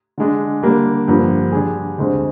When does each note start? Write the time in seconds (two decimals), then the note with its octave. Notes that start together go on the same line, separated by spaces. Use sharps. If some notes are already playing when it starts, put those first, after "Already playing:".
0.18 D3 G#3 D4
0.63 D3 G3 A#3 D4
1.08 G2 D3 F3 A#3
1.52 D3 G3 D4 G#4
1.98 D2 D3 G#3 C4